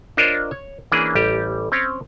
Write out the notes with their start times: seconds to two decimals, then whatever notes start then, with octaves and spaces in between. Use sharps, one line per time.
0.17 D4 F4 A#4 C5 C#5 D#5
0.51 C#5
0.92 E3 A#3 C#4 D4 G#4
1.15 A1 G3 G4
1.72 C4 C#4 C#5